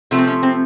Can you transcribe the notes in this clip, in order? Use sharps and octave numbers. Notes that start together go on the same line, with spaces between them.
C3 F3 A3
C4
C#4
C4